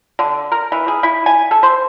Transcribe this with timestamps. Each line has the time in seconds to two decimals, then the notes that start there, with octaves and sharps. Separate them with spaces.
0.19 D3
0.52 A#4
0.72 E3
0.88 G#4
1.03 E4
1.26 G#5
1.51 A4
1.63 C5